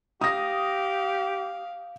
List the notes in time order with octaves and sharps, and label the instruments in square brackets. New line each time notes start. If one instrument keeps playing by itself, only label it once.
[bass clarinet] G4 [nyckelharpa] F5 [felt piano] D#6 A#6